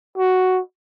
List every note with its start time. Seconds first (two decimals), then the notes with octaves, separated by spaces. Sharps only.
0.18 F#4